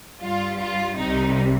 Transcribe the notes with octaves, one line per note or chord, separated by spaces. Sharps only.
G2 G3 F4
F4
C2 C3 G3 D#4